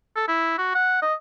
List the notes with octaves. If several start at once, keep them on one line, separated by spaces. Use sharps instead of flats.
A4
E4
F#4
F#5
D#5